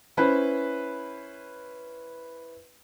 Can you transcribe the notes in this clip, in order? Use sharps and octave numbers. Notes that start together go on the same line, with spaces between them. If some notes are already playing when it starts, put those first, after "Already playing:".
C#4 E4 B4 C5